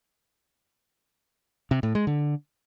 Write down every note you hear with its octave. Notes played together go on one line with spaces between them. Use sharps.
C3
A2
G#3
D3